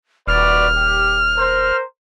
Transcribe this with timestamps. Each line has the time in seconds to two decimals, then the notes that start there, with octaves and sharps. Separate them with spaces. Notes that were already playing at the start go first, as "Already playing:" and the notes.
0.28 D#1 F#4 B4 D5 F6
0.75 G4
1.36 A#4 C5